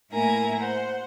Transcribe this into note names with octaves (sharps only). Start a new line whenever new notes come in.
A2 A#3 E4 A#4 G#5 A#5
C5 F#5